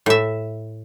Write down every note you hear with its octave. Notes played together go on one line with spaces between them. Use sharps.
A2 E5